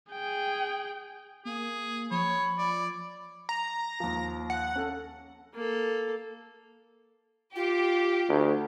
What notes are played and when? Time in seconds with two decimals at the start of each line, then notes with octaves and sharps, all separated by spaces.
0.12 G#4 G5
1.45 A#3 G#4
2.11 F3 C#5 B5
2.59 D5
3.49 A#5
4.00 D#2 F3
4.50 F#5
4.75 C#4 A4
5.54 A#3 A4
7.56 F4 G4
8.29 D2